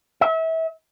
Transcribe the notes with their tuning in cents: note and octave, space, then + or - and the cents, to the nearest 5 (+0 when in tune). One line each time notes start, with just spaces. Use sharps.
E5 -30